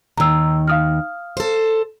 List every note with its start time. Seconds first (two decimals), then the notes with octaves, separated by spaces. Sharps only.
0.17 D#2 D#3 A#5 E6
0.68 F5 D#6 F6
1.37 A4 C5